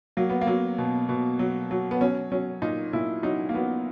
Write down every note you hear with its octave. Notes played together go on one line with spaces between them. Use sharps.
F#3 A#3
B3
A#3
F#3
B2
B2
F#3
F#3
B3
F#3 C#4
F#3 C#4
A#2 D#4
A#2 E4
F#3 D#4
A#3
F#3 B3